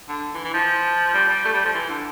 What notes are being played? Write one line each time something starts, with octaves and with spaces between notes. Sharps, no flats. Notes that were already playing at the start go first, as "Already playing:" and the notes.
D3
E3
E3
F3
G3
G3
A3
G3
F3
E3
D3